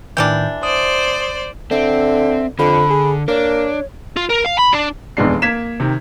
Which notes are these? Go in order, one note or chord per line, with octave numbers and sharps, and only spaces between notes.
A2 D#3 E3 G3 D4 G6
C5 D5 D#6
D3 C4 E5
F2 D3 B5
G#4
A#3 D4 C#5
F4
A#4
F5
B5
D4
F1 B1 E2 G#3 D4 C7
A#3 G#6 B6 E7
C3 D#3